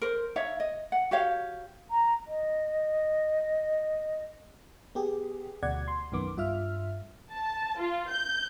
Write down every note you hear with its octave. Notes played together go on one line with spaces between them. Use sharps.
A#4 C5
D#4 C#5 E5 F5
D#5
F#5
F#4 G4 C#5 F5
A#5
D#5
B3 G4 G#4
D2 B2 D5 F#5 G#6
C6
B1 F#2 D#3 B3 D6
G2 F4 E5 F6
A5
F4
G6